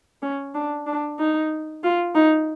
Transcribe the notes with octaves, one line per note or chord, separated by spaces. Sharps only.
C#4
D4
D4
D#4
F4
D#4